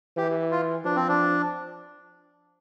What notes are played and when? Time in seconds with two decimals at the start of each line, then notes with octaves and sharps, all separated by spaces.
0.17 E3 G4
0.51 F4
0.85 F3 D4
0.96 C4
1.08 D4